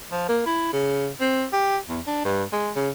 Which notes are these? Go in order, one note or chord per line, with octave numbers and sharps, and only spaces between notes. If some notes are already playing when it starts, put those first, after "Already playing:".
F3
A#3
E4
C#3
C4
G4
E2
D4
G2
G#3
C#3